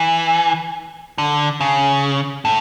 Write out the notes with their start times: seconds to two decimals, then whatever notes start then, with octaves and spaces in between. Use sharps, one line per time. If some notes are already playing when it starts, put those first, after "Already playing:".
Already playing: E3
1.18 D3
1.61 C#3
2.45 A2